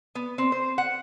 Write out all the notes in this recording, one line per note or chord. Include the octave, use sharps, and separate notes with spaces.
B3
C4
C5
F#5